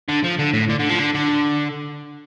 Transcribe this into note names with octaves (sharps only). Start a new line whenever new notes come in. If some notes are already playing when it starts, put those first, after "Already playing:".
D3
F3
D3
A2
D3
D3
F3
D3
D3